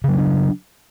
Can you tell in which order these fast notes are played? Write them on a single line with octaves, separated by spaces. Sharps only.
C#3 F#3 C#4 D4